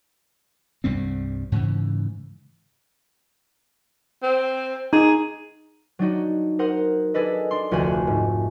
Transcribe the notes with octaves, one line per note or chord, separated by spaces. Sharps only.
C2 G2 G3 C4
G#2 C#3 E3
C4
D#4 G#4
F#3 D4 D#4 F#4
A#4 C5 F#5 D#6
D4 G#4 A4 B4 D#5
D4 C6
F1 D2 F#4 G#5 F#6
G#2